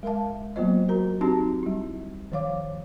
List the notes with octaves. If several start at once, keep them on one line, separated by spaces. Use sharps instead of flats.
G#3 A#4 E5 F5 A5
F#3 A#3 B3 F4 C5 D#5
F#4 A#4 A#5
C4 D4 D#4 F#4 G4 A5
G3 E4
D#3 F3 C#5 F5 D6